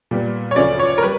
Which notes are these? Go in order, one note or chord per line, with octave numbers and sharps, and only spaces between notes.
A#2 G3 B3
C#5
D2 C#3 F3 A3 C#4 D5
C#5
A#4
G3 B4